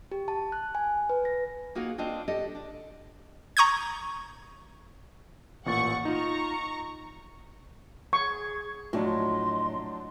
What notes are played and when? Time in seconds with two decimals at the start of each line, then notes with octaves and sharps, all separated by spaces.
0.12 G4
0.28 A5
0.52 F#6
0.75 G#5
1.10 B4
1.25 A#6
1.75 A#3 D#4 F4 F#4 G#4 F#5
1.98 C4 D4 F4 D#5
2.28 D4 G4 A4 D#5
2.55 D4
3.57 A#5 C#6 D#6 G6 G#6
5.66 A1 A#2 F#5 C#6 A6
6.05 D#4 F4 A#5 C#6
8.13 G#4 C#6 G#6
8.93 A2 F3 F#3 D4 D#5 C6